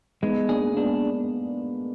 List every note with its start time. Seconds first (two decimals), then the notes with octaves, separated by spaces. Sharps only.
0.22 G#3 B3 D#4
0.49 A#3 D4 G#4
0.72 A#3
0.77 G#3 B3 D4